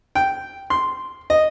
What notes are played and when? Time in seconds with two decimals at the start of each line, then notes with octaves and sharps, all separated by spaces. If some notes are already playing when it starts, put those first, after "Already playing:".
0.15 G5
0.70 C6
1.30 D#5